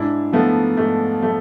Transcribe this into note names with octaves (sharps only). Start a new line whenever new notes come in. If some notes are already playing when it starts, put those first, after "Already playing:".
Already playing: G#2 D4 E4
F3 A3 B3
G#2 A3
F3 A3